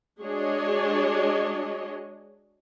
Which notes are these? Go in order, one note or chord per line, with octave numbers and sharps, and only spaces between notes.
G#3 D4 F#4 G#4 C#5 D#5